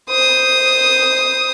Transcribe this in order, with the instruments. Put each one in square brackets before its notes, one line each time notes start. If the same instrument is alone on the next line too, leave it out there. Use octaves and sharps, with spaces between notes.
[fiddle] C5 D#6